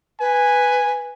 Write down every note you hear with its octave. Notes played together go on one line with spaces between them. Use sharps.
B4 G#5